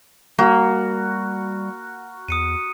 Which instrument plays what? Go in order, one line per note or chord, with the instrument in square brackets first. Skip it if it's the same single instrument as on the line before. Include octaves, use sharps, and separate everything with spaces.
[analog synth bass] G3 [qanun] A#3 [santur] F#4 [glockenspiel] A#5 F6
[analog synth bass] E2 [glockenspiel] D#6 C#7 D#7